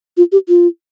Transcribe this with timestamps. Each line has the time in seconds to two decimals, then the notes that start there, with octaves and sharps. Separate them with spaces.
0.17 F4
0.32 G4
0.48 F4